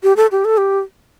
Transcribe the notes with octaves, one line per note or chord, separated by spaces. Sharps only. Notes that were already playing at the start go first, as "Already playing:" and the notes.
G4
A4
G4
A4
G4